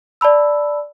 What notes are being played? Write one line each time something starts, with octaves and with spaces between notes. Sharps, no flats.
D5 A5 B5 E6